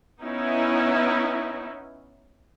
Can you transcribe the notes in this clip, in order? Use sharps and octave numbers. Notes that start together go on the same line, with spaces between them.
B3 C#4 D#4 E4